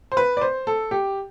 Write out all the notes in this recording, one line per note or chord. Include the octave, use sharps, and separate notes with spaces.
C5
B4
D5
C5
A4
G4